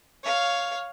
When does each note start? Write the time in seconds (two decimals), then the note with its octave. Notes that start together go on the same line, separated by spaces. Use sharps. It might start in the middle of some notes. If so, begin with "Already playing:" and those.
0.23 C#5 F5